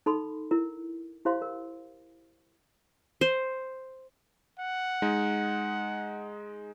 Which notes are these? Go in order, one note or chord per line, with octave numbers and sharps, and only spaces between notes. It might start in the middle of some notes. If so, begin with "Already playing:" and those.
D#4 A4 B5 C6
E4 A#4
E4 G4 C5 F5 C6
A#4
C5
F#5
G#3 D#4